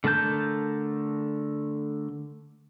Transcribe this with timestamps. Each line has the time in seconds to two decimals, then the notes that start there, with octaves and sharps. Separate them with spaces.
0.04 D3 A3 A#4 A5 G6